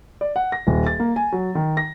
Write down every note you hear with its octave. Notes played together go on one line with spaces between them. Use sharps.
D5
F#5
A#6
D#1
A6
A#3
G#5
F#3
D#3
A#6